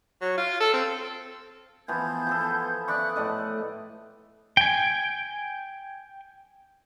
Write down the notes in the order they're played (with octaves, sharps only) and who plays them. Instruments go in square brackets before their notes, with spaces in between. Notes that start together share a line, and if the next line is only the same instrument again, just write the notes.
[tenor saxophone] F#3
F4
A4
C4
[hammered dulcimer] E3 F3 B3 [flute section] G6 G#6
[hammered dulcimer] F3 B3 A4
[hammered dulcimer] D5 B5 C#6 [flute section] E5 D#6 F#6
[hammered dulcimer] A2 D5 D#5 [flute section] A4
[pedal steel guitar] G5 G#5